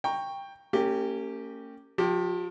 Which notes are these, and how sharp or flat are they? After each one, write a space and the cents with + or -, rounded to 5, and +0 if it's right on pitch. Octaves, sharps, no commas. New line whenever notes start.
G5 +15 A#5 +0 C#6 +0
A#3 -40 C#4 +0 G4 +0
F3 +35 G4 +0